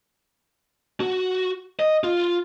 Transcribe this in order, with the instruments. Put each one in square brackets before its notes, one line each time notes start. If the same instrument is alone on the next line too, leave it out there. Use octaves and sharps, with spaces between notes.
[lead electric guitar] F#4
D#5
F4